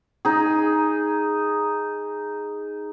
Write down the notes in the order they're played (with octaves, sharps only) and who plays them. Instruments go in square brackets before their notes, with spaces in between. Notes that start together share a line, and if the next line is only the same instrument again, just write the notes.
[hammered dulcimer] D#4 G#4